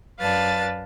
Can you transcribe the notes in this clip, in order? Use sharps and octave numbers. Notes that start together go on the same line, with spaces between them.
F#2 B4 D5 F5 A5 A6